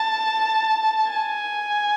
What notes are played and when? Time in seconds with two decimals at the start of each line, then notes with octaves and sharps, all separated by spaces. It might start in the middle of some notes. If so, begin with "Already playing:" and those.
Already playing: A5
1.11 G#5